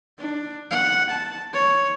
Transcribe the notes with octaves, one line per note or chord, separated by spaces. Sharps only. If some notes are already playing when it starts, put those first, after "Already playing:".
D4
F#5
A5
C#5